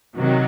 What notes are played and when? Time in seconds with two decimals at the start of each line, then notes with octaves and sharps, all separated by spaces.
0.16 C3 D#3 F#3